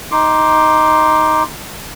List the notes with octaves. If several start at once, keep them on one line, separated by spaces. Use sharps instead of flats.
D#4 C6 D6